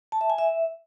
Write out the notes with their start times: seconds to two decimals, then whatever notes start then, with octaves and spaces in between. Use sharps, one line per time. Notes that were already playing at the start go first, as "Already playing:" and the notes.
0.12 A5
0.21 E5
0.30 G#5
0.38 E5